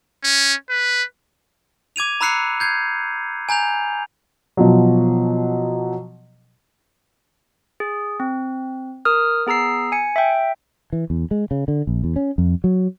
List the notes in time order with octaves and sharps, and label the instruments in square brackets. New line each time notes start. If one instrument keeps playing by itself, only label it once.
[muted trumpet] C#4
B4
[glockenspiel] D6 G#6 D#7 F7
A#5 B5 E6 F#6 C7 C#7
G6 G#6 C7
G#5 A#5 G6 F7
[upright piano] B2 F3 F#3
[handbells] G#4
C4
A#4 D#6 F6
B3 G#4 A#5 E6 C7
G#5 C#7
E5 G5
[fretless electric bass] E3
E2
G#3
C#3
D3
A#1
E2
C#4
F2
F#3